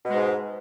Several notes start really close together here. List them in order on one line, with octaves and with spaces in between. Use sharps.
B2 G#3 G#2